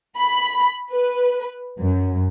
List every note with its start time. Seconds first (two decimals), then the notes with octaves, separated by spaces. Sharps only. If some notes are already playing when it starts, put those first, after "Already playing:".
0.19 B5
0.92 B4
1.80 F#2